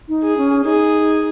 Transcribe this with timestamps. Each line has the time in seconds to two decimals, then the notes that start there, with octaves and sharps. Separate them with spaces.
0.08 D#4
0.22 G#4
0.37 C#4
0.65 D#4 G#4